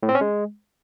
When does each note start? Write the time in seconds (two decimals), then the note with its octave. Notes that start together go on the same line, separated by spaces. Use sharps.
0.03 A2
0.09 C4
0.15 C#4
0.21 G#3